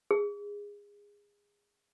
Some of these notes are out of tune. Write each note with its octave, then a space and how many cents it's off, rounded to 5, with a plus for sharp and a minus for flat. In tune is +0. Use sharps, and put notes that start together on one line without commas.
G#4 -20